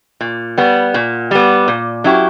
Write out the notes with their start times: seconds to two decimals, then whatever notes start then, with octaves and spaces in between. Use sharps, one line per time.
0.21 A#2
0.58 G3 B3
0.94 A#2
1.31 G3 B3
1.68 A#2
2.04 F#3 C#4 E4 G4